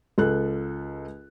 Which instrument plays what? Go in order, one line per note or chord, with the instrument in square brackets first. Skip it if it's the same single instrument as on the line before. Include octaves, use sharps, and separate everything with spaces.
[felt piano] C#2 A4 F#6